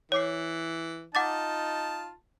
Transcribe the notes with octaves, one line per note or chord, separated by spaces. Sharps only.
E3 C#5 D6 C7
D#4 F4 F#5 A5 D6 A6